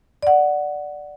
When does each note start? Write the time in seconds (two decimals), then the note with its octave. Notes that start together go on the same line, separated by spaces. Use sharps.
0.23 D5 F#5